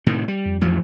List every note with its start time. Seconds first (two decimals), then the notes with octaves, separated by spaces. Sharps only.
0.06 A2 C3 D#3
0.28 G3
0.46 F2
0.61 A1 F3 F#3